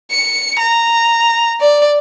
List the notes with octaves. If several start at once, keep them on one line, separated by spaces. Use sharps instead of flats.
C#7
A#5
D5